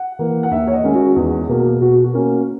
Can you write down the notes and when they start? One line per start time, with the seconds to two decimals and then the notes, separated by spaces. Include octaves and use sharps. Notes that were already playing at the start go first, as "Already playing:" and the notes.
Already playing: F#5
0.19 E3 A#3
0.43 F#5
0.51 D#2 E5
0.67 C#5
0.73 D#5
0.84 D#3 G#3 C#4
0.95 F#4
1.16 E2 G#4
1.49 B2 A#3
1.81 B2 F#4
2.04 F#4
2.13 A#3 C#4